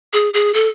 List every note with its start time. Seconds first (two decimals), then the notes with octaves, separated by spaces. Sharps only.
0.13 G#4
0.34 G#4
0.54 A4